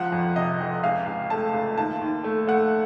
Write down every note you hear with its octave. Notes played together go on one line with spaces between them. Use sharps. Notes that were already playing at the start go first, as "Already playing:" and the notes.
Already playing: C#2 F3 F#5
F2
C3 D#5
F2
C#2 F5
C#2
A3 A5
C#2
D#2 A5
D#2
A3
A3 F#5